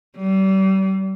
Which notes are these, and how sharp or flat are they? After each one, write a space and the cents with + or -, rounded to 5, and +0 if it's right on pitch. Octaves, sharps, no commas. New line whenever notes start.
G3 -35